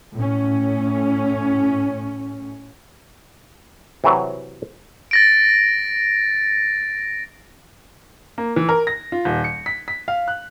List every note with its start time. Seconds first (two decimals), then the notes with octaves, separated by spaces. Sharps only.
0.14 A2 C#4
4.04 C3 E3 F#3
5.11 A6 A#6 D7
8.38 A#3
8.56 E3
8.69 A#4
8.87 A#6
9.12 F4
9.25 D#1
9.44 C#7
9.66 B6
9.88 B6
10.08 F5
10.28 F#6